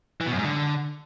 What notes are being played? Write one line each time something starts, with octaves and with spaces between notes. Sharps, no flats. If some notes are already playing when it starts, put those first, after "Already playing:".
E3
B2
F#2
G#2
D3